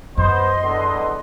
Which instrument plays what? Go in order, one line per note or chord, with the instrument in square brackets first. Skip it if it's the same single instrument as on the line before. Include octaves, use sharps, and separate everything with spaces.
[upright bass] F#2 [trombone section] B3 C5 [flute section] D#5 C6
[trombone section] E2 D3 B3